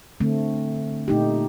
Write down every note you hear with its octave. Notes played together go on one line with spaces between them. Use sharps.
D3 A3 C4
A#2 A3 D#4 G4